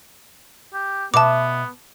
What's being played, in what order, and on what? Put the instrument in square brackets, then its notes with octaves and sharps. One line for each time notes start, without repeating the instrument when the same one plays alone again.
[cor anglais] G4
[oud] B2 E5 [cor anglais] B3 [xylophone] A5 D6